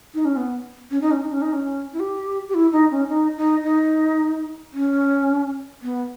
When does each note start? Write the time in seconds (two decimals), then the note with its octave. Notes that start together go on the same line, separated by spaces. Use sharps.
0.15 D#4
0.25 C#4
0.37 B3
0.91 C#4
1.01 D#4
1.11 C#4
1.21 D#4
1.32 C#4
1.42 D#4
1.53 C#4
1.93 E4
2.00 G4
2.48 G4
2.54 E4
2.72 D#4
2.91 C#4
3.09 D#4
3.37 D#4
3.63 D#4
4.73 C#4
5.82 B3